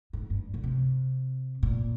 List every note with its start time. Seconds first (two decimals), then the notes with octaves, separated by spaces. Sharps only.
0.13 G#2
0.30 G2
0.54 A#2
0.64 C3
1.63 A#2